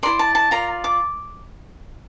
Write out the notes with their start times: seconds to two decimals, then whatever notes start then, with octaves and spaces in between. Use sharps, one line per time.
0.03 E4 A#4 D5 C6
0.19 A5
0.35 A5
0.51 F4 A#4 D5 A#5
0.84 D6